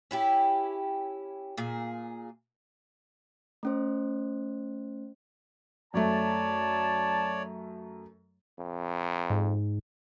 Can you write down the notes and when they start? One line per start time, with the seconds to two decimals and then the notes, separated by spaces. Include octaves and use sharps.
0.11 C#4 E4 G4
1.58 A#2 G#4
3.63 A3 C#4 C5
5.94 F#2 A3 C#5 D5 A5
8.58 F2
9.30 G#2